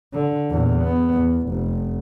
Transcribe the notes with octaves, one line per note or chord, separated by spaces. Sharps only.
D3
E2 A#2
B3
E2
F1